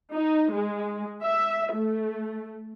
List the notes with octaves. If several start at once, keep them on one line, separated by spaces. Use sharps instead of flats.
D#4
G#3
E5
A3